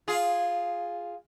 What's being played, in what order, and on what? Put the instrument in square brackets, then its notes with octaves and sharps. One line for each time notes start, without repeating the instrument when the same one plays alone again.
[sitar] F4 G#4